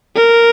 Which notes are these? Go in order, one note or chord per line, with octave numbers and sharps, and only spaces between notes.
A#4